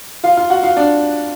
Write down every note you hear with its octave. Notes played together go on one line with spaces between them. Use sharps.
F4 F5
F4 F5
F#4 F#5
F4 F5
D4 D5